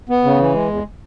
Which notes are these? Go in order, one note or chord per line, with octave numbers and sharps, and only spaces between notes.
B3
C#3
E3
G#3
E2